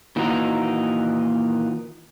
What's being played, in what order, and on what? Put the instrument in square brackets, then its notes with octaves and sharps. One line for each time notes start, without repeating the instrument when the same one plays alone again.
[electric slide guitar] A#2 D#3 E3 A#3 D#4 F#4